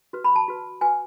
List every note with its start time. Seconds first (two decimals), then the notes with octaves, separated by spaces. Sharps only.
0.13 F#4 B4
0.24 B5
0.36 A5
0.48 F#4 B4
0.81 F#4 B4 G#5